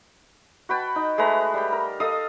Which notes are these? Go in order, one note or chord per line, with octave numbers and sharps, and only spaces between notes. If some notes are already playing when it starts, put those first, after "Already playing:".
F#4 B4 G5 A5
D#4
G#3 A3 B4 A#5
G3 G5
A#4
A4 D#5 F5 D#6